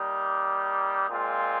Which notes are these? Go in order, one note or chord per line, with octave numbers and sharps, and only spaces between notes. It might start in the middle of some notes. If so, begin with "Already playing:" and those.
Already playing: G3 A#3 D#4
A#2 G#3 C4 F4